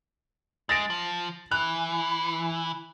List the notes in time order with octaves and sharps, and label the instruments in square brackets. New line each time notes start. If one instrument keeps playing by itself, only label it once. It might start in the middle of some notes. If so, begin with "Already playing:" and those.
[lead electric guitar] G#3 [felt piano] A6 A#6 D7
[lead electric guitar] F3
[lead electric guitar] E3 [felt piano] F#6